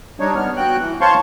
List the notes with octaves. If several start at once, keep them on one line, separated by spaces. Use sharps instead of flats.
G3 D4 D#4 C#5
B3 F6
F#4 G5 F#6
E3
C5 C#5 F5 A5 C6 C#6